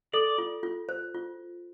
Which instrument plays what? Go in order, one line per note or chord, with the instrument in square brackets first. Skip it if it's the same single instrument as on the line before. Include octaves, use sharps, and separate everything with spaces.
[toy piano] A4 [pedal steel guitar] D5
[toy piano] F4
F4
C5
F4